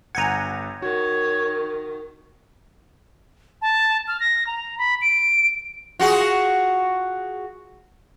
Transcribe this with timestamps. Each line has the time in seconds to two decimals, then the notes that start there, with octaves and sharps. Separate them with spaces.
0.15 G1 F#5 G#5 A#5 G6 G#6
0.82 D#3 F#4 C#5
3.62 A5
4.08 F6
4.20 A#6
4.47 A#5
4.78 B5
5.02 D7
5.99 F4 F#4 G#4